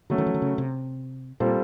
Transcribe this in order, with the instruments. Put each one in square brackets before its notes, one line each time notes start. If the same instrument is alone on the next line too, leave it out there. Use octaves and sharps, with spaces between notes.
[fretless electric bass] D3 [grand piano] F#3 A3 C#4
[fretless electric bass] D#3
E3
D#3
C#3
C3
[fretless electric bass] A#2 [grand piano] G3 C4 F4 A4 C5